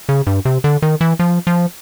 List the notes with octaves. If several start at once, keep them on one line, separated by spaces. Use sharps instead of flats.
C#3
G2
C3
D3
D#3
E3
F3
F3